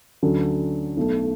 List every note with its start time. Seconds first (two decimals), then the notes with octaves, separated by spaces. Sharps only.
0.22 D2 D3 F#3 C#4
0.97 B1 B2 A3